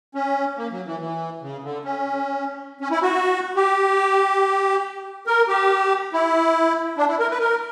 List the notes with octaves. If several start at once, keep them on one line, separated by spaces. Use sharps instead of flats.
C#4
A#3
F#3
E3
E3
C#3
D3
C#4
C#4
E4
F#4
G4
A#4
G4
E4
D4
E4
A#4
B4
A#4